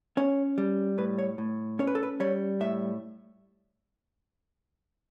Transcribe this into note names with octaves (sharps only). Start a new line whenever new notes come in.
C#4 C#5
G3
A2 B4
C#5
A2
C#4 C#5
B4
A4
B4
G3 C#5
A2 E5